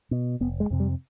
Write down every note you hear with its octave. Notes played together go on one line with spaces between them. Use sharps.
B2
F1 B3
G#3
F2 C3
G3